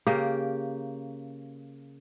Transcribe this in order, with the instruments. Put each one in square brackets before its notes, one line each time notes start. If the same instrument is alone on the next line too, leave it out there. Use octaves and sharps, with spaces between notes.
[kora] C#3 A#3 G4